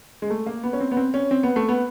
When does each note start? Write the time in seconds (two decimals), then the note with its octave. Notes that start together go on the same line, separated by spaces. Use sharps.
0.22 G#3
0.30 A3
0.46 A#3
0.63 B3
0.73 C#4
0.80 C4
0.91 B3
0.97 C4
1.14 C#4
1.31 C4
1.43 B3
1.56 A3
1.69 B3